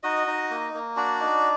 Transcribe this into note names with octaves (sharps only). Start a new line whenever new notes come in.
D#4 F#4 D#5
D#4
A#3
A#3
D4 F#4 D5
D#4